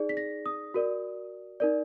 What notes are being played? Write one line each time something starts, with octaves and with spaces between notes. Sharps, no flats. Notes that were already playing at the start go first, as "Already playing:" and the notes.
Already playing: D#4 G#4 D5
B6
A#6
D#6
F#4 A#4 D5
D#4 A#4 D5